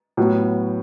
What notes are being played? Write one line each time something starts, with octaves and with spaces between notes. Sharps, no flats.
A2 F#3 B3